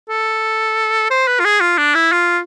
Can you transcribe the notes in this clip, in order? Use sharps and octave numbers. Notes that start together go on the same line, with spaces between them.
A4
C5
B4
F4
G#4
F4
D4
E4
F4